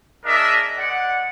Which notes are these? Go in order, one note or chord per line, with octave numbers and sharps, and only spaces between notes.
D4 G#4 A#4 D#5 E5
G#3 D5 F#5